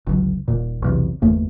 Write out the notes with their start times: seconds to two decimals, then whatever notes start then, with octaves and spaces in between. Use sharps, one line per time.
0.07 G1 C#2 F#3
0.48 D#1 D#2 A#2
0.82 B1 E2 C3
1.22 G1 E2 A3 A#3